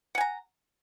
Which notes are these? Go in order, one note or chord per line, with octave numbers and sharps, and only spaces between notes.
F#5 G#5 A#5